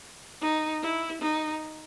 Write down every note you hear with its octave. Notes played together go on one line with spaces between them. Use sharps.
D#4
E4
D#4